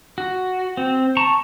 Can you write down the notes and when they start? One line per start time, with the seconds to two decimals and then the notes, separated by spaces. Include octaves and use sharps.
0.18 F#4
0.77 C4
1.17 A5 A#5 C#6